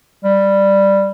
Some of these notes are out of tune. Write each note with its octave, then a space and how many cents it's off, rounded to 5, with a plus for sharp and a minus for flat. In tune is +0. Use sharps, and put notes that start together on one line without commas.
G3 +5